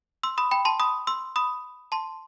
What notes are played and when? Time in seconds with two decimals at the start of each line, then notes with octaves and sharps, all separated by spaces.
0.23 C6 E6
0.38 B5 D#6
0.51 G5 B5
0.65 A5 C6
0.80 B5 D#6
1.07 C6 E6
1.36 B5 D#6
1.92 A5 C6